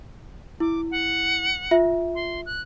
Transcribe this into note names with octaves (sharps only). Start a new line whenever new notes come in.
E4 D6
F#5
F4 E5
C6
F#6